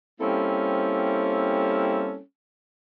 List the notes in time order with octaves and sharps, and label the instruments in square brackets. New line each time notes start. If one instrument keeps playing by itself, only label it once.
[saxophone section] G3 A#3 C4 C#4 E4 A4